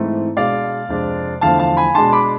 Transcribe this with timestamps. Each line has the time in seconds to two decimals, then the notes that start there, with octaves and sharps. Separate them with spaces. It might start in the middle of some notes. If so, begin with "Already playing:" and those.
Already playing: G#2 E3 A3 C4
0.37 B2 G#3 D4 D5 F5
0.89 F2 C3 G#3 D4
1.41 E2 D3 F3 A3 F5 A5
1.59 F5 A5
1.77 G#5 B5
1.95 B2 G#3 D4 A5 C6
2.12 B5 D6